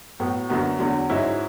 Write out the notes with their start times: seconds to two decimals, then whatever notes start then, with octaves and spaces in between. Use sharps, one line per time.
0.20 A2 F#3 B3
0.50 F#2 D3 F#3 B3
0.79 E2 D3 F#3
1.09 G#2 F#3 C#4 E4